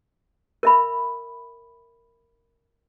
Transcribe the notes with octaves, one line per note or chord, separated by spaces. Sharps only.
A#4 E5 B5